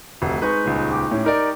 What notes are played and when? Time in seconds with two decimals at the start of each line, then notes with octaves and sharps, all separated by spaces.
0.22 F1 D2
0.42 G#3 D#4 B4 C#6
0.65 D#1 C#2
0.91 G4
1.11 A2 C#4
1.24 D#4 A#4 D5